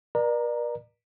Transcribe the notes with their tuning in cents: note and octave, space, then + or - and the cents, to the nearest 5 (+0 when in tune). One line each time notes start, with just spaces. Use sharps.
A#4 +45 D5 +30 A#5 +0